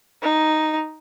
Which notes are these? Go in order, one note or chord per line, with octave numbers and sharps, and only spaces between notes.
D#4